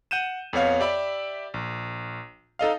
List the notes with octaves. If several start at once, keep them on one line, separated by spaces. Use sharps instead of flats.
F#5 G6 D#7 E7
F2 B3 C#5 F5
G4 D5 E5 B5
A#1
D#4 A4 D#5 F5